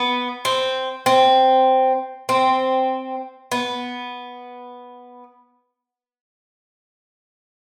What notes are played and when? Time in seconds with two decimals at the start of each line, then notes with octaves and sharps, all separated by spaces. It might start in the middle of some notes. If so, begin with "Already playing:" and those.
Already playing: B3
0.45 C4
1.06 C4
2.29 C4
3.52 B3